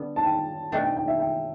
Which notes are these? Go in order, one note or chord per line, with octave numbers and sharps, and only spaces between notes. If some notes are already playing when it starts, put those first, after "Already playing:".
Already playing: D3 G3 B3
A5
G5
B2 A3 D4 G5
G5
G5
E5
G5